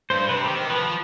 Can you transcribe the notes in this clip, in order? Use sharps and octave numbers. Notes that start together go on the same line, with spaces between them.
G2 C5
C5
C3 B4
D#3 G4
F3 B4